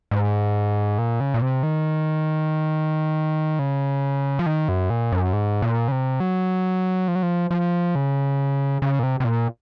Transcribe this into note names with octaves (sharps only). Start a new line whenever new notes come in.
G#2
A#2
C#3
A#2
C3
D#3
C#3
F3
D#3
F#2
A#2
F#2
G#2
A#2
C#3
C3
F#3
F3
F#3
F3
F3
C#3
C#3
A#2
C3
C3
A#2